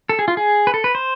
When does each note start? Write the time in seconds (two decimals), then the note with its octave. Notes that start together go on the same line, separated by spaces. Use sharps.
0.09 A4
0.19 G#4
0.28 F4
0.37 G#4
0.67 B4
0.74 A4
0.84 B4
0.95 C5